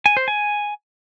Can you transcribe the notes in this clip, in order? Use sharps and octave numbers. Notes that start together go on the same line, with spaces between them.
G#5
C5
G#5